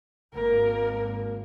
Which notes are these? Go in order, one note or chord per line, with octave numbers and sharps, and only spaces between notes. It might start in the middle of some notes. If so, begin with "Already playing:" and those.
G#1 A#3 A#4